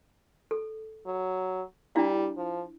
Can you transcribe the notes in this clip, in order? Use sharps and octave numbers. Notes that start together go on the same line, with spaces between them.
A4
F#3
G3 D4 E4 F5
F3